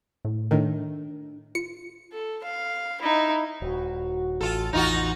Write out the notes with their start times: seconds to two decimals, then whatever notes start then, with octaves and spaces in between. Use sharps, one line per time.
0.25 A2
0.51 A2 D#3 D4
1.55 F4 C#7
2.13 A4
2.44 F5
3.01 D#4 E4
3.62 D#1 F#4
4.41 A1 F4 A4
4.73 A1 E2 E3 D#4 F4 F#4 A#6